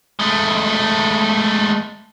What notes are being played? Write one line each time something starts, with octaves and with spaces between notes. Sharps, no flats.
G#3 A3